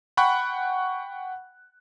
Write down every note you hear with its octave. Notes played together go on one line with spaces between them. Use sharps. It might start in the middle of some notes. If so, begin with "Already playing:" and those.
F#5 G5 B5 C#6 F#6